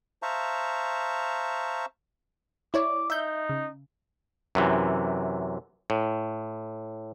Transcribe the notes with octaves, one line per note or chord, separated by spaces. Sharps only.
C5 E5 F5 A5 A#5 C#6
E4 C#5 D5 D6
D#4 E5 G6
C#3
F#2 C3 E3
A2